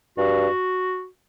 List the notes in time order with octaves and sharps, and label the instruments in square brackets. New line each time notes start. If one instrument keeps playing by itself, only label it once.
[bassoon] G2 [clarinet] F#4